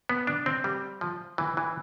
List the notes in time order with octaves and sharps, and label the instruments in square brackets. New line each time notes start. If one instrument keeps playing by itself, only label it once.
[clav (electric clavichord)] B3
D4
C4
G3
F3
E3
E3